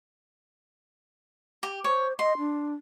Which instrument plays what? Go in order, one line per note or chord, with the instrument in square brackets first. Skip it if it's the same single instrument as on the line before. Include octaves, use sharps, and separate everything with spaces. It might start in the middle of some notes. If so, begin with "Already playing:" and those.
[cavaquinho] G4
[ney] C5 [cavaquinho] C#5
[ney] D#5 [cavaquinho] C6
[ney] D4